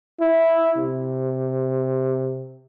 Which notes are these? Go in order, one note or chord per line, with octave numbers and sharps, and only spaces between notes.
E4
C3